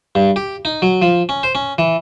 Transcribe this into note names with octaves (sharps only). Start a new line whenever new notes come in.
G2
G4
D#4
F#3
F3
C#4
C5
C#4
E3